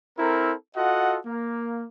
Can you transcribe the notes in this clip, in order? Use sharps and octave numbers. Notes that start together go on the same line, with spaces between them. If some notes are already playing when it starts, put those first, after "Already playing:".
C4 E4 A4 A#4
F4 F#4 A4 D#5 F#5
A#3